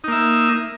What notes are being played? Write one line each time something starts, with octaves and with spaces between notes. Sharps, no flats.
A#3 D#4 E5